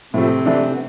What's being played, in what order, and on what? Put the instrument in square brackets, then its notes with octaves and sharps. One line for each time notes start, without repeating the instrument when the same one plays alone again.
[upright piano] A2 F3 A3 [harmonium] C3 C4
[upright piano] E3 A3 D4
[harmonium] B3